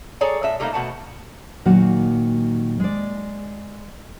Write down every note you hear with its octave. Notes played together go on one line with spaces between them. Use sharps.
G#4 A4 C#5 D5 A#5
A2 E5
G3 A3 A#3 D#4 F5
B2 A3 F#5 A5
A#2 D#3 F#3 A#3 F#4
G#3 D5